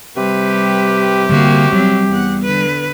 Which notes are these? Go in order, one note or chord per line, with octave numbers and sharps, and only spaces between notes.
C3 G3 G4 B4
D3 G3 A#3 F#4
F#3 G3 C4
E2 F#5
D3 B4